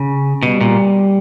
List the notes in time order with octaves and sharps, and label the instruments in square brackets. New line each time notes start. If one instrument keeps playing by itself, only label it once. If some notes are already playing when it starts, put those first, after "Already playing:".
Already playing: [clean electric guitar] C#3
[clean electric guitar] B2 [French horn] G3
[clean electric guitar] A#2